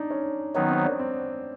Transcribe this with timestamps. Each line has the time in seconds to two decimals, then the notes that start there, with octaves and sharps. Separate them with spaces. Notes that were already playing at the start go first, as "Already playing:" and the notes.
Already playing: D4 D#4
0.10 C#4
0.54 D#3 F#3 B3 C#4 D#4
0.70 C4
0.85 D4
0.99 C4